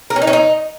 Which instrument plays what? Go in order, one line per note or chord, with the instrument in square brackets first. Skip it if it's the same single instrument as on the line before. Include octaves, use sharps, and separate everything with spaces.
[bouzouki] A#4
C#4
D#4
C#4
D#4